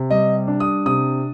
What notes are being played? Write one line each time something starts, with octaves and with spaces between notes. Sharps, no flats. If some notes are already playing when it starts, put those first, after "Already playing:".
Already playing: C3
G3 D#5
D4
D#6
C3 D#6